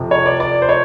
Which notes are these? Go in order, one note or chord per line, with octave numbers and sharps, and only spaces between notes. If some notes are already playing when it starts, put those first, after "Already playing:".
Already playing: F2 C3 F3
C#5
D5
D5
C5
C#5